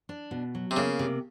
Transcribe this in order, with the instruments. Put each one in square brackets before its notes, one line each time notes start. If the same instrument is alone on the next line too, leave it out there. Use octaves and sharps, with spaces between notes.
[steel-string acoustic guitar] D4
B2
F#3
[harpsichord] C3
[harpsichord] C#3 [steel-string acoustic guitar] A#3
[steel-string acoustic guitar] C3